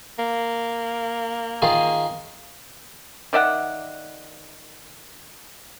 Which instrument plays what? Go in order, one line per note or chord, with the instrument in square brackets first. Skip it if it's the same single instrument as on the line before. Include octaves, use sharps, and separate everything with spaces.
[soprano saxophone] A#3
[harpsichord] D#3 F4 G#4
[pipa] D#3 D5 E5 F#5